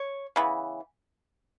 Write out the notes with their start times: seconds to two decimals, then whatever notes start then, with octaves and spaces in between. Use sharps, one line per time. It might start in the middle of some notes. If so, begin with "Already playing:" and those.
Already playing: C#5
0.36 C#3 E3 B3